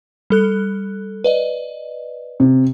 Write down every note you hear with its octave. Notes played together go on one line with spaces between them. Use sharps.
G3 A4 F#6
B4 D5 D#5
C3